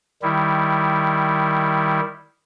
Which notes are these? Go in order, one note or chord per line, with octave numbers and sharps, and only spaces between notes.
D#3 G3 E4